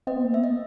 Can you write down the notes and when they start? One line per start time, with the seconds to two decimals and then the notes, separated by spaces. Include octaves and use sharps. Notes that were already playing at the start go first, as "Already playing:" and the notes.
0.07 C4 D#5
0.17 B3
0.24 A#3
0.34 B3 E5
0.44 D#5